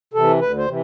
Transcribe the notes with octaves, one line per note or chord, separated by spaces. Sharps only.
C3 E3 A4
D2 B4
C5
C3 E3